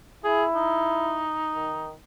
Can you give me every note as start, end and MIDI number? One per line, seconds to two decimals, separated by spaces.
0.24 1.24 64
0.24 0.44 68
0.55 1.95 63
1.54 1.92 51